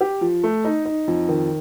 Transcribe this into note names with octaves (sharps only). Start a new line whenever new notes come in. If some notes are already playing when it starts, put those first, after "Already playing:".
G4
F3
A3
D#4
D#4
F2
D#3